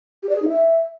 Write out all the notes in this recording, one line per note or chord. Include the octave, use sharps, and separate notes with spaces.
G4
D5
G#4
D#4
E5